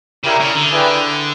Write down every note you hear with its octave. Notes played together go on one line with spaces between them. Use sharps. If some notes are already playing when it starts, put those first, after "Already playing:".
C#3 E4 G4 A#4 D5
C#3
D3
E4 G#4 B4 D5 G5